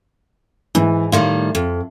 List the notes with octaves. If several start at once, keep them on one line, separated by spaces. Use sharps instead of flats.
G#2 E3
A2 D#3 G3 F5 C6
F2